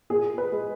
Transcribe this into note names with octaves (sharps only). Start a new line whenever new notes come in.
A#2 G#4
B4
G#3